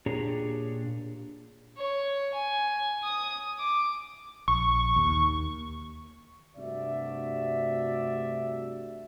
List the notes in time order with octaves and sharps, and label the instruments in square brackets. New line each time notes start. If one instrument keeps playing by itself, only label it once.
[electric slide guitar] A#2 D4 G4 G#4 C#5 A#5
[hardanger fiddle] C#5
G#5
D#6
D6
[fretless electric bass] A#1 [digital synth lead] C#6
[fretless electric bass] D#2
[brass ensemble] G2 C3 A3 F#4 D5 E5